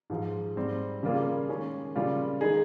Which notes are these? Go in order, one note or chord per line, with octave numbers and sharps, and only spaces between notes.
G#2 F3 G#3
G#2 G3 C4
C#3 G3 A#3 F4 G#4
D#3 G#3 C#4 G#4
C#3 G3 A#3 F4
D#3 G#3 D#4 G#4